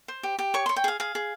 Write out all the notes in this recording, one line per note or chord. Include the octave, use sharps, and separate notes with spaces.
C5
G4
G4
C#5 C#6
C#5 C6
G5
G#4 F5
G#4 F5
G#4